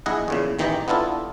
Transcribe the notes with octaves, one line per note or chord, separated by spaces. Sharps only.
A#1 E4 G#4 D#5 F#5
E2 A#2 C#3
A1 D#3 E3 D#4 G4 D#5
B3 D4 E4 F4 A4